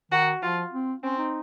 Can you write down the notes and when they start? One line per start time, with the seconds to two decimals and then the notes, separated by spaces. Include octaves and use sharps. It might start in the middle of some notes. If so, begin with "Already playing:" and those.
0.11 D#3 F#4
0.41 F3 F4
0.72 C4
1.03 C4 C#4
1.18 D#4